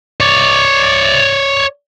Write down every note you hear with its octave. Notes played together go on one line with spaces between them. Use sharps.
C#5 D5